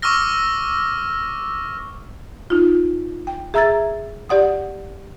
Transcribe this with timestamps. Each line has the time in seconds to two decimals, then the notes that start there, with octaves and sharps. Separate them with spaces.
0.02 C#6 D6 E6 F6 A#6
2.50 D#4 F4
3.27 G5
3.54 G#4 E5 A#5 E6 G#6 A6
4.29 G4 D5 F#5 D#6